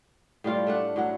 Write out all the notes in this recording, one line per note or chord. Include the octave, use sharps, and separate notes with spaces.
A2 G3 F4 D5
A3 D4 F#5
A2 F#3 F#5